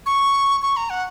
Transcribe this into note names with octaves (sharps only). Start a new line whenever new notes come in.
C#6
C#6
A#5
F#5